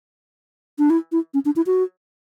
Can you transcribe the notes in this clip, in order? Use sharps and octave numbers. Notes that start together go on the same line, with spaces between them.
D4
E4
E4
C#4
D4
E4
F#4